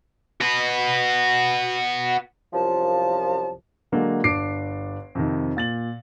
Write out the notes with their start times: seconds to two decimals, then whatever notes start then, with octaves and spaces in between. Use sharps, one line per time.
0.41 F#4 B4
2.53 C2 F#2 F3 A5
3.92 D3 F#3 G#3 A#3 D4
4.24 G1 D4 D6 C7 D7
5.15 F2 C3 D#3
5.57 A#2 A6 F#7